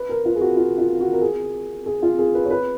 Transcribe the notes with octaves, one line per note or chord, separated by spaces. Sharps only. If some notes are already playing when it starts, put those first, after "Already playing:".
Already playing: B4
A#4
F4
G#4
F#4
F4
F4
F#4
A#4
G#4
G#4
F4
G#4
B4
C#5
B4